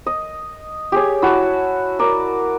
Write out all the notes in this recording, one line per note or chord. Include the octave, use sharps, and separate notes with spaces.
D#5
G4 G#4 C#5
E4 F#4 A5
A#4 D5